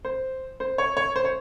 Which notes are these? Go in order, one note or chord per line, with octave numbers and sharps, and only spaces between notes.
C5
C5
C#5
C#5
C5
C#5